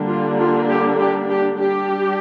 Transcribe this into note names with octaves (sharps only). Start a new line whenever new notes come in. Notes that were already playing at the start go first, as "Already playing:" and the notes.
Already playing: D3 G3 A#3 D4
F4
F4
G4
G4
G4
G3 D4 G4